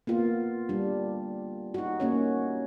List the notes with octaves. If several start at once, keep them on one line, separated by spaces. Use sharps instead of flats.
A#3 B3 F4
G3 D4
D#4 F#4
A#3 C#4 C#5